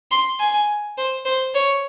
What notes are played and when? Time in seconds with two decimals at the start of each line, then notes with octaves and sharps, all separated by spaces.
0.11 C6
0.40 G#5
0.98 C5
1.25 C5
1.55 C#5